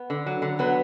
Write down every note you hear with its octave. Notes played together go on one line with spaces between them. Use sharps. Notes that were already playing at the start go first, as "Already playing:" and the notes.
Already playing: B3
D3
F#3
D3
F#3 B3